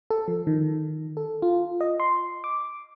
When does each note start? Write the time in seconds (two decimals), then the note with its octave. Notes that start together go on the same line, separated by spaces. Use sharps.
0.10 A4
0.28 F3
0.47 D#3
1.17 A4
1.42 F4
1.81 D#5
2.00 C6
2.44 D6